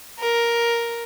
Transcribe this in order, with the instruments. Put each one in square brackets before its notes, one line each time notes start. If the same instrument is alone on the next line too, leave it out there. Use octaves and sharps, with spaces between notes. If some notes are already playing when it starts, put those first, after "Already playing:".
[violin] A#4